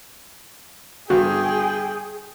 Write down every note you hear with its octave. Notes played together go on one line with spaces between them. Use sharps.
G2 D3 B3 F#4 G#4 G5